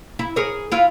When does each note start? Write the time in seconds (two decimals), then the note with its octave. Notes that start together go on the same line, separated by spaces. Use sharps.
0.19 E4
0.36 G#4 A#4 C#5
0.72 E4 F4